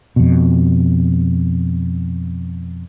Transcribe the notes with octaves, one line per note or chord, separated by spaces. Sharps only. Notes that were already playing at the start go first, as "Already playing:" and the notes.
F2 B2